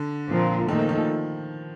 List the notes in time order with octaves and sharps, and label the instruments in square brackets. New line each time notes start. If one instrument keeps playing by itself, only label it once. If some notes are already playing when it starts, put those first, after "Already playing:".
Already playing: [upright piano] D3
[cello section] A#2 F3 C4 F4 A#4
[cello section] A#2 A3 D#4 A4 [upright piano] D#3
[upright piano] F3
D#3